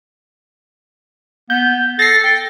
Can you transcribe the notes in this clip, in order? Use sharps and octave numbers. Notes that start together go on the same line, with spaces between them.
B3 G6
A4 A6 A#6 C7
G5